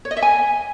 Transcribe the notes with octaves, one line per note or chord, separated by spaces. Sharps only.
C#5
D#5
E5
G#5